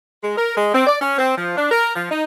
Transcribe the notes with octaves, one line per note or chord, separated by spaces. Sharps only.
G#3
A#4
G#3
C4
D5
C#4
C4
F3
D4
A#4
F3
D#4